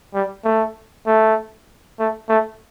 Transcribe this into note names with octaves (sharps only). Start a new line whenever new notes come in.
G3
A3
A3
A3
A3